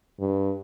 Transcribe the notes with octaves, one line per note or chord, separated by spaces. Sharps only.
G2